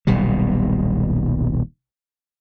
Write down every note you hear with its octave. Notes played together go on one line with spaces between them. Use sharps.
D#1 B1 B2 G3